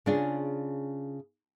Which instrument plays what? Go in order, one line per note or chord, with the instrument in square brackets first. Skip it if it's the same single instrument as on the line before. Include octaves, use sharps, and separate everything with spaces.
[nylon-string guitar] C#3 C#4 D4 F4 G#4